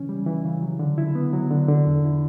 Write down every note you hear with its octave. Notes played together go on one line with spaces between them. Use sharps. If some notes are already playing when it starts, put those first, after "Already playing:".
Already playing: C#3 E3 C#4
G3
E3
C#3
F#3
D3
E4
B3
F#3
D3
D3
E2
E4